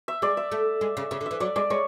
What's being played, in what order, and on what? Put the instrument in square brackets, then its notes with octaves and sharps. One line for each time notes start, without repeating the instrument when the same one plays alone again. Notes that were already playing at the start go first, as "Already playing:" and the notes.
[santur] E5
[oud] G#3 [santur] D5
[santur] E5
[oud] A3
G#3
C#3
[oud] C#3 [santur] E5
[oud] D3
[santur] E5
[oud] E3
[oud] F#3 [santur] D5
[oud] G#3 [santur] D5
[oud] G#3 [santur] C#5